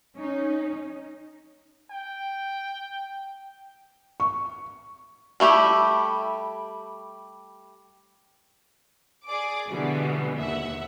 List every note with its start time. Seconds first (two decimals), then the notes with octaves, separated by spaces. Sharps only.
0.17 C#4 D#4
1.90 G5
4.20 C#6
5.40 G3 A3 E4 G4
9.26 G#4 D5 D6
9.68 B2 D3 E3 G3 G#3 B3
10.38 D#2 E5 F#5